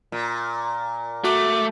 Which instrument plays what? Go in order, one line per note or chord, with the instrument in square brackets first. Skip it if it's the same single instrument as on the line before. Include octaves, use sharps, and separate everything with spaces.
[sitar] A#2
[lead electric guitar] A3 [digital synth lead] F#4 [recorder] D6